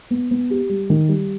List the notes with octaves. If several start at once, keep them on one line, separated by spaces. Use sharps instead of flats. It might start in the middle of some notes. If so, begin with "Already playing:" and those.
B3
B3
G4
G3
D#3
G3